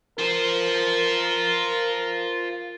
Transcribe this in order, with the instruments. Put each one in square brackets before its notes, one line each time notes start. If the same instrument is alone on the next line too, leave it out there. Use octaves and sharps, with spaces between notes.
[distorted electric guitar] F4 C5 [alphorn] A#4